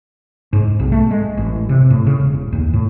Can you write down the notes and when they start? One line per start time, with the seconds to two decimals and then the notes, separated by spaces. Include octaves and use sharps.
0.53 G#2
0.80 B1
0.92 A3
1.11 G#3
1.37 A1
1.69 C3
1.90 A2
2.07 C#3
2.20 E1
2.52 D#2
2.73 A2